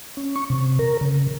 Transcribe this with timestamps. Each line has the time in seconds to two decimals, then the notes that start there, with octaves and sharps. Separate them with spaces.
0.17 C#4
0.36 C#6
0.50 C3
0.79 A#4
1.01 C#3